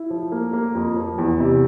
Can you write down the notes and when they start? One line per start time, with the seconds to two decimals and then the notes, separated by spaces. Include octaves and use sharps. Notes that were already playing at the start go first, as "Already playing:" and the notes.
Already playing: E4
0.10 F3
0.32 A#3
0.53 A#3
0.75 F2
0.96 F3
1.18 E2
1.40 C3